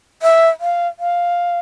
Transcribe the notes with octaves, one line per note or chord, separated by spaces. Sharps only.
E5
F5
F5